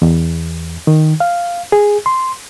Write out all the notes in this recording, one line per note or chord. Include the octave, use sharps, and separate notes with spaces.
E2
D#3
F5
G#4
C6